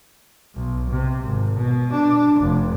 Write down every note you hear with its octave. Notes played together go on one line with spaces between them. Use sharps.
B1
C3
G#1
B2
D4
F1